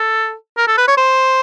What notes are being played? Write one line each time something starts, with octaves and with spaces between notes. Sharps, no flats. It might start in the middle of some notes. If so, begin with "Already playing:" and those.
Already playing: A4
A#4
A4
B4
C#5
C5